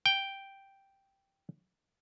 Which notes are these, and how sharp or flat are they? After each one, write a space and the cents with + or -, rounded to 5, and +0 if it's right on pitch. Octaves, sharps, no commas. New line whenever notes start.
G5 +0